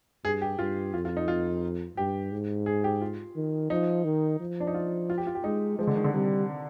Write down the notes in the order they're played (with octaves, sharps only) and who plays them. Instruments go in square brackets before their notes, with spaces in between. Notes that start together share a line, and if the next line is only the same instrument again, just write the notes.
[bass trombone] G2 [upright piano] G#4
[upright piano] G4
[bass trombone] G2 [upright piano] F4
[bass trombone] F2 [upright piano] F4
[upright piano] F4
D#4
F4
[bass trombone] G2 [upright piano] G4
[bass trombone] G#2
[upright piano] G#4
G4
F4
[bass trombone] D#3
[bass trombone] F3 [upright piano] D#4
[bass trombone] D#3
F3
[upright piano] D4
D#4
F4
F4
G4
F4
G4
[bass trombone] G#3 [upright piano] D#4
[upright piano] F3 [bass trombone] G#3
[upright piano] D3
D#3
D3
[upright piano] C3 [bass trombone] G3